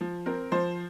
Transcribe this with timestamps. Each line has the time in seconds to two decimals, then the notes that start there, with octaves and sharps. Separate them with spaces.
0.01 F3
0.26 C4 A#4
0.52 F3 C5